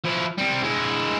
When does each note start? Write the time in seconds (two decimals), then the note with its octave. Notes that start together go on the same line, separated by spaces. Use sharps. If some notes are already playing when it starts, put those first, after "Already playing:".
0.05 F3 E4
0.38 G3 C4
0.64 G#3 E4